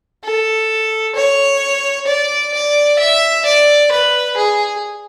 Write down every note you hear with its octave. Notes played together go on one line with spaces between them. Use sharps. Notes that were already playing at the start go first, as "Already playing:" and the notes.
A4
C#5
D5
D5
E5
D5
B4
G#4